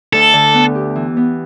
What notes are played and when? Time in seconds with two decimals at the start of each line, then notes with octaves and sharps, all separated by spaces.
0.13 D2 A4
0.33 D3
0.54 B3
0.75 G4
0.96 E3
1.17 B3